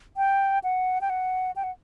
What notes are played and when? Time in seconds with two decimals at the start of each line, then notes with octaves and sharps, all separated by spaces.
0.17 G5
0.64 F#5
1.01 G5
1.10 F#5
1.56 G5
1.64 F#5